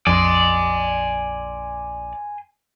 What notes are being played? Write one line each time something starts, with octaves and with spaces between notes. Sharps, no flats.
A#1 F2 D5 G#5 C6